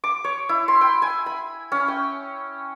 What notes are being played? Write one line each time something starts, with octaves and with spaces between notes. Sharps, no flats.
D6
C#5
E4
C6
G5
G#5
B5
C#4
G5